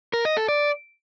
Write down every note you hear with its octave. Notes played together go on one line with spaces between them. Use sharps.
A#4
D#5
A4
D5